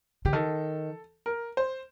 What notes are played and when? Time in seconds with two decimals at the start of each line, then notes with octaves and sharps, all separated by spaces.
0.25 D3 G4
0.33 D#3 A4
1.26 A#4
1.57 C5